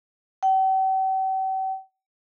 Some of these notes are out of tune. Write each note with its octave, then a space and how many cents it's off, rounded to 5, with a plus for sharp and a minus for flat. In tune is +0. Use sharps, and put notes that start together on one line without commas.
G5 -45